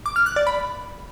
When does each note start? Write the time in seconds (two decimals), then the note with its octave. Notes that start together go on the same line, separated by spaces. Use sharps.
0.06 D6
0.16 F6
0.26 F#6
0.36 D5
0.47 B5